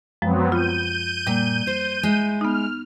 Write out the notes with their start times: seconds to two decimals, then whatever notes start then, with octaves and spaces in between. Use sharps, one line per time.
0.22 F#2 F3 F#3 G#3 B3 C4
0.52 F4 G6 D#7
1.27 A#2 G3 A#3
1.67 C5
2.03 G#3 E4
2.41 B3 D#4 F6